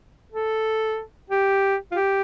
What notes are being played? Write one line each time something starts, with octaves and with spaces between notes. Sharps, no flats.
A4
G4
F4
G4